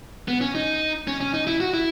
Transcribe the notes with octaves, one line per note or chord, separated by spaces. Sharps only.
B3
C#4
D#4
C#4
C#4
D#4
E4
F#4
E4